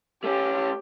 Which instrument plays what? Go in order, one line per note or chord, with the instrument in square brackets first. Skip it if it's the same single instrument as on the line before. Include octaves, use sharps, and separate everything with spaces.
[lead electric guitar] A3 C#4 [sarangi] G4